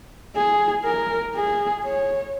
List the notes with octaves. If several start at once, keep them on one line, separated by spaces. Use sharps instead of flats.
G#4
A#4
G#4
C#5